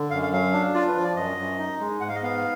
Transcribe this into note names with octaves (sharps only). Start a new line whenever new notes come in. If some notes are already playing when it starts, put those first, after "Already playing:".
Already playing: D3
F#2 F5
F5
F#3 F5
D4
F4 D5
B4
F3
D5
F#2 D#5
F#2
D#4
G#3
G#2 F#5
F5
D#5
B3 F5